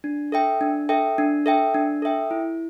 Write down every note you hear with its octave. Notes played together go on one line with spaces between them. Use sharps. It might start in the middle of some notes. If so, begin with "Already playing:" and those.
D4
A4 E5 G5
D4
A4 E5 G5
D4
A4 E5 G5
D4
A4 E5 G5
E4